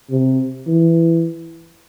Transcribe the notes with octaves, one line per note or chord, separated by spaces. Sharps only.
C3
E3